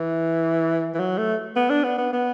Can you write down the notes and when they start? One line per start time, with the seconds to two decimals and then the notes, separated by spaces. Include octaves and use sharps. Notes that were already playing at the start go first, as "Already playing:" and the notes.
Already playing: E3
0.94 E3
0.99 F#3
1.18 A3
1.56 B3
1.70 D4
1.84 B3
1.98 B3
2.13 B3